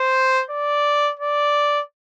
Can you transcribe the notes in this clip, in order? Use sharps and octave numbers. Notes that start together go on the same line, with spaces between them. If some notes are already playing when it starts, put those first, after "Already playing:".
Already playing: C5
D5
D5